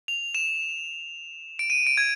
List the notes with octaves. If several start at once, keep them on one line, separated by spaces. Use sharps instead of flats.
F7
E7
D7
D#7
D7
G#6